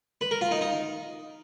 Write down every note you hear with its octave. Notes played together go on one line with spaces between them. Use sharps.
B4
A#4
F4
D#4
D#4